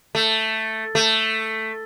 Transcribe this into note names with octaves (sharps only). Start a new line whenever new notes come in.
A3
A3